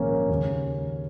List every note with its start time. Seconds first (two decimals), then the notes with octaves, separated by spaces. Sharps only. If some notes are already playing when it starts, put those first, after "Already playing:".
Already playing: A#1 G#2 D#3 A#3 C#4
0.29 D#2 C#3